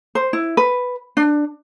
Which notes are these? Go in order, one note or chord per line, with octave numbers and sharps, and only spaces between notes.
C5
E4
B4
D4